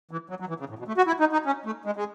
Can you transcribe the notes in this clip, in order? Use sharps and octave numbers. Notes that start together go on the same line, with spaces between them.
E3
F#3
F#3
E3
C#3
A2
B2
A3
F#4
E4
D#4
D#4
C#4
A3
G#3
G#3